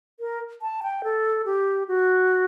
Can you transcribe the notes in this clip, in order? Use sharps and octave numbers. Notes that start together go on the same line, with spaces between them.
A#4
A5
G5
A4
G4
F#4